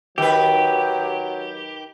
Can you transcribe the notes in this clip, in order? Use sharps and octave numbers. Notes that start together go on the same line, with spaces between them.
D#3 F#3 G4 B4